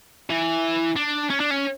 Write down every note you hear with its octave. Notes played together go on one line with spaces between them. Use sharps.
E3
D4
C#4
D4
C#4